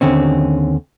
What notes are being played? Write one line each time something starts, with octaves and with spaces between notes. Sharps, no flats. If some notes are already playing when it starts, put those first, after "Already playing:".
D#2 D3 C4 C#4